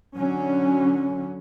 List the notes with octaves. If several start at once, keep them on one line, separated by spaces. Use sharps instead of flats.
D3 F#3 C#4